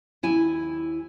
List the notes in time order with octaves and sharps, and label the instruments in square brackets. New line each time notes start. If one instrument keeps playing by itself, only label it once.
[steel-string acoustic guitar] D#2 E4 G#5